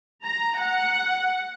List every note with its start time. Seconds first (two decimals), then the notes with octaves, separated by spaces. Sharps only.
0.24 A#5
0.59 F#5